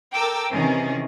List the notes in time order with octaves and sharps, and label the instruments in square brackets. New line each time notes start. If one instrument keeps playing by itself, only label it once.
[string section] A4 A#4 G5 D6 E6
C3 D#3 E3 C#4 G#4